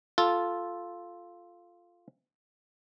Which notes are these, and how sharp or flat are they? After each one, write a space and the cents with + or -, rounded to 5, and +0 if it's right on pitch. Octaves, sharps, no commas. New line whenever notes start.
F4 +0 A4 -5